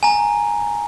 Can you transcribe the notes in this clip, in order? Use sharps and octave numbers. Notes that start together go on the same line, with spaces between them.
G#5 A#5